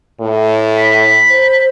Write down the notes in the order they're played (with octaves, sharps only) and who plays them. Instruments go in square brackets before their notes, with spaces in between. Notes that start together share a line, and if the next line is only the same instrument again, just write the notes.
[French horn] A2
[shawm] B5
[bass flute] C5